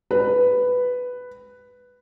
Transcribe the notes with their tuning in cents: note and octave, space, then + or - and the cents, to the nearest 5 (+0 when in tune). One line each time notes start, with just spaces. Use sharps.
B4 +5